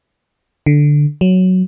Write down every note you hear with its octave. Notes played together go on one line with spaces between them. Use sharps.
D3
F#3